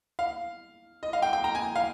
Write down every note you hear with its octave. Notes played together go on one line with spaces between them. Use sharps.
F5
D#5
F5
G5
G5
A#5
G#5
F5